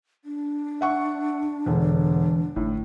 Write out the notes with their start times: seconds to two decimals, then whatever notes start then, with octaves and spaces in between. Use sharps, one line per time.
0.25 D4
0.81 E5 F#5 C#6
1.66 E1 D3 E3
2.56 G1 A2